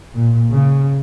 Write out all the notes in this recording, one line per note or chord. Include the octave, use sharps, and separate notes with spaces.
A#2
C#3